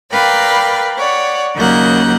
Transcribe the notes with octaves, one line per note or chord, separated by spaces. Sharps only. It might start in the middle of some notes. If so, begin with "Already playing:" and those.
A#4 B4 D5 F5 G5
C#5 D5 F#5
D#2 C#3 F#3 A#3 F#5 G6